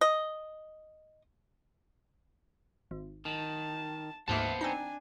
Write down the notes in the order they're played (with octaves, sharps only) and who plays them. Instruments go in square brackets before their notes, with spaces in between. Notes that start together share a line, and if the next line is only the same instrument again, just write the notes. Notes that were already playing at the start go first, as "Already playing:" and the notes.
[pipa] D#5
[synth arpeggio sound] G#1
[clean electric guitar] D#3 [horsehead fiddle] A5
[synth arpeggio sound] D2 G#2 A#3 [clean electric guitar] B3 C5 A5 [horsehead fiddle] E5 F#5
[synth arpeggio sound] C4 D#4 [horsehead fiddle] D4 G#5